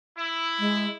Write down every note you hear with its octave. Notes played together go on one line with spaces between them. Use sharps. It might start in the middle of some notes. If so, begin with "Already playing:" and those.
E4
G#3